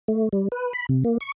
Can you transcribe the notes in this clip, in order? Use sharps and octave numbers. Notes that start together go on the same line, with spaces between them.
A3
G3
B4
B5
C3
A#3
C#6